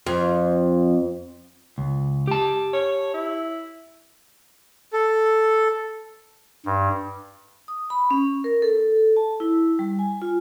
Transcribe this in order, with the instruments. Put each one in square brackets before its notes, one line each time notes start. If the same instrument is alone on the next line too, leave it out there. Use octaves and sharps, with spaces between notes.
[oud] F2
[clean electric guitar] C#2
G4 A5
[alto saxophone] C#5
E4
[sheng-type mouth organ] A4
[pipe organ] G2
[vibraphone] D#6
B5
C#4
A#4
A4
A5
E4
G3
G#5
F4